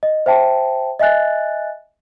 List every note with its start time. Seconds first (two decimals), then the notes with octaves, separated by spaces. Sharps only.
0.03 D#5
0.26 C5 E5 G5 A5
0.99 D#5 E5 G#5 F#6 A6